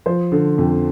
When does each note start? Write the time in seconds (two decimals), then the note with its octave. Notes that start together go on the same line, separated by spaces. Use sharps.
0.06 F3 C5
0.32 D3
0.58 F2